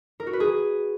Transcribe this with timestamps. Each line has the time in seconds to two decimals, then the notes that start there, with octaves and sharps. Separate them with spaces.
0.20 A#4
0.26 F#4
0.33 B4
0.40 G#4